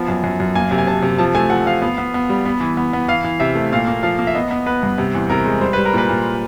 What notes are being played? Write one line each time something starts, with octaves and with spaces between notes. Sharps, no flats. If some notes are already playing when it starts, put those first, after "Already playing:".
Already playing: F3 B3
F#2
F#2
F#2
A#3 G#5
C3
G#5
C3 A5
C3
F3 A5
A3 G#5
F3 F#5
F3 F5
B3
B3
B3
G3
B3
E3
B3
B3
E3 F5
E3
C3 E5
A3
A#2 F5
A#3
F3 F5
A#3
E5
B3 D#5
B3
B3 B4
G2
C3
E2
C3 A#4
G#3
G3 C5
G3 B4
A#4
A#2 B4
A#2